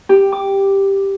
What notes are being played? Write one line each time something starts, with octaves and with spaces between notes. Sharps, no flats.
G4
D6